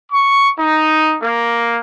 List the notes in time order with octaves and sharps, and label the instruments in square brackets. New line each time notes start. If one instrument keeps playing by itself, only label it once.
[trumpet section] C#6
D#4
A#3